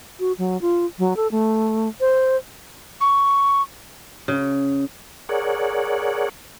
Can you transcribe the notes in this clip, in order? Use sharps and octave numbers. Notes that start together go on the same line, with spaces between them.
F#4
F#3
F4
F#3
A4
A3
C5
C#6
C#3
G#4 A#4 C#5 D5 F#5